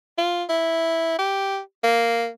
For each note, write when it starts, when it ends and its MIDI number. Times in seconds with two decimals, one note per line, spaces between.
0.18 0.44 65
0.49 1.15 64
1.19 1.60 67
1.84 2.29 58